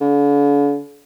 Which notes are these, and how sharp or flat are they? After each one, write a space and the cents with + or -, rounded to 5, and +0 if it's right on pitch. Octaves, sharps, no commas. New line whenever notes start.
D3 -45